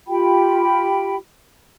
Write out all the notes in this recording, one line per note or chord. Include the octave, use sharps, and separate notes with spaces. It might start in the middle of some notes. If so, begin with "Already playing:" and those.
F4 G4 G5 B5